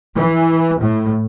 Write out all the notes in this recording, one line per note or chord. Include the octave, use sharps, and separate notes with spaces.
E3
A2